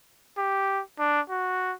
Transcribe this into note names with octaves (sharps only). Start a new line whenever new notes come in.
G4
D4
F#4